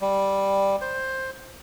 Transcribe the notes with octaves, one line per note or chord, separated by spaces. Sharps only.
G3
C5